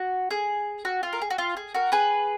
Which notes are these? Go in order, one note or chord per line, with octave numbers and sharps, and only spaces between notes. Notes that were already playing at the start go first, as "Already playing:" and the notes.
Already playing: F#4
G#4
F#4
F4
A#4
G#4
F#4
F4
G#4
F#4 A#4
G#4 B4